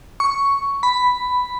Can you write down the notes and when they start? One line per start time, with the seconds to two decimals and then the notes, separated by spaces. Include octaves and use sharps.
0.20 C#6
0.83 B5